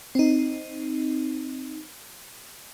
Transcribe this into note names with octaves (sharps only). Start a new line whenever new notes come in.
C4 D#4